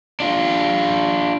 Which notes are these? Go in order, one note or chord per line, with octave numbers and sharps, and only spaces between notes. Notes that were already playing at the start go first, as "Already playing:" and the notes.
D4 F4